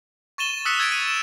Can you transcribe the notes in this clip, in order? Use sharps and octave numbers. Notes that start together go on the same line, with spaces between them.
C#6 A6 D#7 E7 G7
D#6 E6 F#6 B6 C#7
E6 G#6 A6 B6 D7
D#7
E7